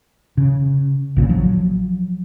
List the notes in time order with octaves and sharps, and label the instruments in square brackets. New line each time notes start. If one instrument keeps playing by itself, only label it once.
[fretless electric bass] C#3
A#1 A#2 C#3
F3 F#3